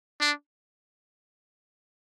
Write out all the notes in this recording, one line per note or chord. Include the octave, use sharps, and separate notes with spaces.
D4